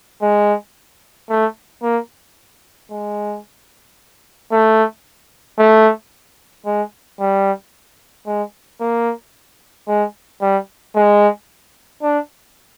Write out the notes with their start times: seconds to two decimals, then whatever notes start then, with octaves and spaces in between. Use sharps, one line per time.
0.22 G#3
1.30 A3
1.83 A#3
2.90 G#3
4.52 A3
5.59 A3
6.66 G#3
7.20 G3
8.27 G#3
8.81 A#3
9.88 G#3
10.41 G3
10.96 G#3
12.02 D4